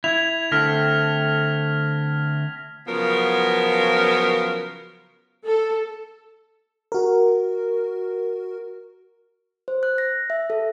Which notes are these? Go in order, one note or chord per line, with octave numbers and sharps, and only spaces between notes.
E4 G#6 F7
D3 A3 C4 F6 A#6 B6
C#3 F3 F#3 B3 F4 A#4
A4
F#4 A#4
C5
F#6
A#6
E5
A4